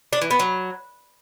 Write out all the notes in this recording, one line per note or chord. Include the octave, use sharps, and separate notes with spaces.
D4
E3
B3
F#3